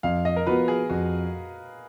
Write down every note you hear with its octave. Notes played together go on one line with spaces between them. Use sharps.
F2 F5
D#5
A#4
F3 B3 F#4 B4
G#4
F2 F#4